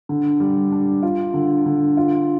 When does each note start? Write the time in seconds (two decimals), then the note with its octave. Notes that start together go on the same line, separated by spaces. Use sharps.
0.09 D3
0.40 G3
0.72 D4
1.03 F4
1.34 D3
1.66 D3
1.97 F4